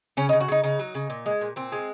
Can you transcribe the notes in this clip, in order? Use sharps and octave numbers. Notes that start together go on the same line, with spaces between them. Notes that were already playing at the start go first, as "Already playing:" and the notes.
C#3 C#4
D#4
C#3
F#4
C#3 D#4
C#3 D#4
F#3
C#3
A#2
G#3
A#2
A#2 C4
G#3